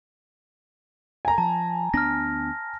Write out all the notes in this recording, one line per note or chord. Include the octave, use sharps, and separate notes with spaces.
G#5 A#5
F3 A5
D2 B3 D4 F6 A#6